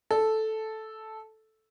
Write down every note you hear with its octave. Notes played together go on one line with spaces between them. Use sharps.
A4